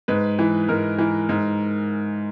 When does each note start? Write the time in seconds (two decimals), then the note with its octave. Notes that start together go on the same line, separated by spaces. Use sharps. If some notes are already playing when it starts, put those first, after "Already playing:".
0.08 G#2 B4
0.39 E3
0.68 G#2 A#4
0.98 E3
1.29 G#2